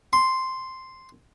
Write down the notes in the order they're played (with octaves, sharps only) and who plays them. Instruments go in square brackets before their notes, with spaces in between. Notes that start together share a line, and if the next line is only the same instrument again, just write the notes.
[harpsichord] C6